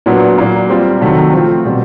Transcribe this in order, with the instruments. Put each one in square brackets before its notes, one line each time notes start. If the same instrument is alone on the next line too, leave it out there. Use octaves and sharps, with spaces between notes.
[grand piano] A#2 F#3 B3 D4
A#2 F#3 A#3
G3 C4 F4
C3 D#3 F#3 A3
F3 A3 C4 F4
B2 G3 C4